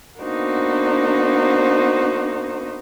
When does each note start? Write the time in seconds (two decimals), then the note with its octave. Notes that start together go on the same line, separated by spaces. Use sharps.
0.19 A#3 B3 D4 D#4 F#4 C5